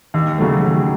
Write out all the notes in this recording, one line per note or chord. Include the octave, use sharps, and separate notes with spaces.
D#2
C#3 F#3 A3
D#2